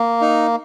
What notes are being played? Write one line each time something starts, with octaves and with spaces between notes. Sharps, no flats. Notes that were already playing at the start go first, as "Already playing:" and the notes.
Already playing: A#3
D#4